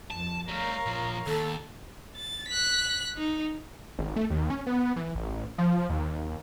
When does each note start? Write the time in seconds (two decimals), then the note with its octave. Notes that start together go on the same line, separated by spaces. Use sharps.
0.10 F2 A5
0.48 G3 A3 A#4 C#5 F5
0.86 A#2 F3
1.27 D#2 A4
2.16 A6
2.49 F#6 B6
3.17 D#4
3.99 G#1
4.16 A3
4.30 D#2
4.50 C#4
4.67 B3
4.96 E3
5.15 A1
5.58 F3
5.89 D#2